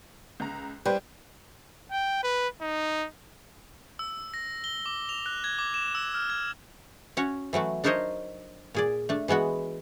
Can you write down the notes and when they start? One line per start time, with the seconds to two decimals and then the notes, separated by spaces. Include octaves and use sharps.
0.40 C#2 A#5
0.86 G3 G4 B4 C5
1.92 G5
2.23 B4
2.61 D#4
3.99 E6
4.34 A#6
4.64 G7
4.86 D6
5.09 F7
5.26 F#6
5.44 G#6
5.59 D6
5.74 E7
5.95 E6
6.14 F6
6.30 G#6
7.17 C#4 F#4 C#5
7.53 E3 F#3 A3 F#4
7.84 D4 D#4 A#4 C5 C#5 D#5
8.75 A#2 G#4 D5
9.09 A3 D4
9.28 E3 G#3 B3 F#4